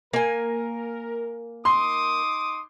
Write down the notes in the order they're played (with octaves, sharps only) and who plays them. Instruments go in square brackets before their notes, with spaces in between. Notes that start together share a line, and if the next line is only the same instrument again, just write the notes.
[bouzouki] A#3 G#5 [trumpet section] A#4
[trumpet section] D#4 D6 D#6 [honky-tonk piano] C6